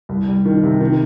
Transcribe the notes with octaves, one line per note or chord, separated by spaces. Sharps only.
C2
G3
D#3
C3
D#3